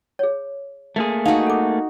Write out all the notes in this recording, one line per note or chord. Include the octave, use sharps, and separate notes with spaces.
G#4 C#5
A3 A#3 G#4
D#4 F#4 F5 A5
A4 D6